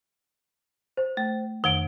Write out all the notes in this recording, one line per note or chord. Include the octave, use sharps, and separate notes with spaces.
C5
A3
F2 D#3 D7 G7